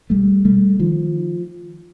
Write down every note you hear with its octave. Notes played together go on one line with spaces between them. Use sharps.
B1 G3 A3
B2 G3 A3
D#3 F3